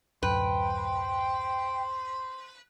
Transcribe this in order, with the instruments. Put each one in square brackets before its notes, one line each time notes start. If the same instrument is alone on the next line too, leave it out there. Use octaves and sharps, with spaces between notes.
[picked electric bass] D1 F#2 [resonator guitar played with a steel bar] B4 [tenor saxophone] C5 [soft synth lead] G5